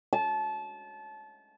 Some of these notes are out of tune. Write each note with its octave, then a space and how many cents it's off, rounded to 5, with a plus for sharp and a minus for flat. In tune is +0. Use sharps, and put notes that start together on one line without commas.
A5 -25